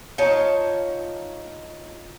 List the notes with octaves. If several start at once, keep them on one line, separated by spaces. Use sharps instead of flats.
D#4 F4 C#5 A5